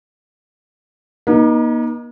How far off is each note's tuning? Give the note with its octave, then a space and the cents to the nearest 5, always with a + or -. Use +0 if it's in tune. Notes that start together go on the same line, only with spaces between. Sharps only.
A#3 +45 D#4 +0